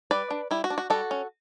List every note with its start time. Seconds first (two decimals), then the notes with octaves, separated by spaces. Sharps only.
0.11 G3 B4 D5
0.31 D4
0.51 G3 E4
0.64 F#4
0.70 D4
0.78 F#4
0.90 G3 F#4 A4
1.11 C#4